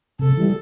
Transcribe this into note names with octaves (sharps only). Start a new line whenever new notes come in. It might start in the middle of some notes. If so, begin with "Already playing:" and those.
C3 A4
E3 G3